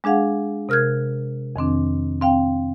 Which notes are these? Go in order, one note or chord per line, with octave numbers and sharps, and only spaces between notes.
G#3 D4 G#4 F5 F#5
C3 A#4 F6 F#6 G#6
F2 D#3 C4 D4
C4 F5 G5